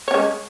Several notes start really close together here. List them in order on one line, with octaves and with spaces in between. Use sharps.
C#5 C#4 G#3